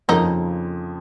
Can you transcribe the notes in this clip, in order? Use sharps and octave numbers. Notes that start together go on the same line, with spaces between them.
F2 C#3 F3 A#3 D#4